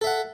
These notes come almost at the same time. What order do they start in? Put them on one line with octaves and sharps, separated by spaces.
A4 E5 F#5